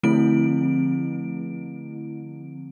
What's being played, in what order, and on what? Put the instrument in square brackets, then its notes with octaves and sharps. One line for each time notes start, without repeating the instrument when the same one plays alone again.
[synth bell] D3 F3 A3 C4 E4 D7